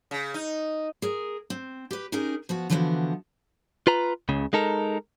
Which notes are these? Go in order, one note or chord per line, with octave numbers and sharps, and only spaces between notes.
C#3
D#4
G#4 A#4
C4
G4 B4
C#4 D#4 G4 G#4 A#4
F3 B3 F#4
D3 E3 F3 B3 F4 F#4
F4 B4 A#5
C#2 C#3
G#3 D#4 A4 A#4